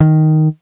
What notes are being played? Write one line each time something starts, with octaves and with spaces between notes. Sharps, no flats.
D#3